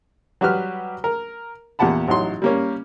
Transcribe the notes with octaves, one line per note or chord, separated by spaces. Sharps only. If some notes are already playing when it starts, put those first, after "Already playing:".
F#3 G3 F#4 G4 B4 F6
A#4
E2 A#2 G4 F#5 A5 B5
A1 F#3 D#4 C6
G3 A#3 C#4